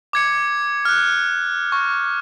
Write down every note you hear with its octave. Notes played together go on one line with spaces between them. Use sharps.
D6 G#6 C#7
F6 F#6
C#6